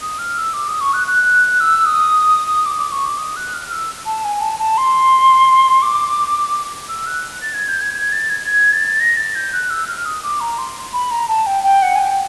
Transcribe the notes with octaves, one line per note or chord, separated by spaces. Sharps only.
D#6
F6
E6
D6
D#6
C#6
F#6
F#6
E6
D#6
D6
D6
C#6
D6
D#6
F#6
F6
E6
A5
G#5
A5
A5
C6
D6
E6
F#6
A6
G#6
G6
G#6
G#6
A6
G#6
G#6
A6
A#6
A6
G6
F#6
E6
F6
D#6
D6
A#5
C6
B5
A#5
A5
G5
G5
F#5
G#5
G5